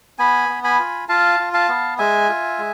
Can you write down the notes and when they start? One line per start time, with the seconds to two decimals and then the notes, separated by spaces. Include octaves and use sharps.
0.19 B3 G#5 B5
0.49 B3
0.64 G#5 B5
0.79 F4
1.09 F4 F5 A5
1.39 F4
1.54 F5 A5
1.69 B3
1.98 G#3 E5 G#5
2.29 F4
2.58 G#3